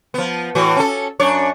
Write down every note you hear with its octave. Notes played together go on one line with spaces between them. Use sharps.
F3 B3
A2 E3 F#4
C#4 A4
F#2 D4 C#5